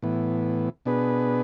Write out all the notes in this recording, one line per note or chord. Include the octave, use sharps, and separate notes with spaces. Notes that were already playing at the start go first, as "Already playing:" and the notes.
A2 E3 B3
B2 B3 D4 G#4 B4